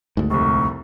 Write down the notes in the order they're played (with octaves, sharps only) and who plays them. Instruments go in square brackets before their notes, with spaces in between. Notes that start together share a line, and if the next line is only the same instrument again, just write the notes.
[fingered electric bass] D2 G#2
[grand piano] F1 C2 [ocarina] C#6